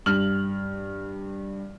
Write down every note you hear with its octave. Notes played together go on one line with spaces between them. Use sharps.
G2 F6 F#7